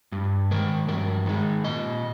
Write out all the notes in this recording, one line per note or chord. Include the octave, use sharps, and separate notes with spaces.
G2
D#3 G#3 A#4
G2 A#4
D#3 G#3
A#2 D#5